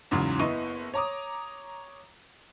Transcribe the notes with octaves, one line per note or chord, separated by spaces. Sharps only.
E2 G#2 C#3 E3 F#3
F#1 B3 E4 D#5 C#6 D#7
C#5 A#5 D6 D#6